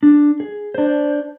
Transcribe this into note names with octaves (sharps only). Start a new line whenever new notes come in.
D4
G#4
D4 C5